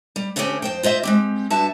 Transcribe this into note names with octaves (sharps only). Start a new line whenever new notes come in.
G3
D2 A3 C4 C#4 G4 G#4
F2 C5 G5
F4 C5 D#5 E5
G#3 C4 G4
G2 F#4 E5 A5